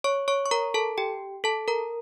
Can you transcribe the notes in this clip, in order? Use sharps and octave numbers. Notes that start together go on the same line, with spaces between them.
C#5 C#6
C#5 C#6
C#6
A#4 A#5
A4 A5
G4 G5
A4 A5
A#4 A#5